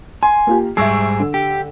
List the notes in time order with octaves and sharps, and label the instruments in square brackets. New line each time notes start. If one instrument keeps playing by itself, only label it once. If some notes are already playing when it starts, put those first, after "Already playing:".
[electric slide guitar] G#5 [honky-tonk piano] C6
[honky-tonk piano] A#3 F4 G4
[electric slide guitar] G#2 G3 G#4 [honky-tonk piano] E5 C#6 E6
[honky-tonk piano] D3
[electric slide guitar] G4